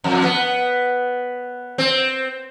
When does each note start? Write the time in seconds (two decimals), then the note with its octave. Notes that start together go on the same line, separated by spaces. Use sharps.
0.04 F2
0.23 B3
1.78 C4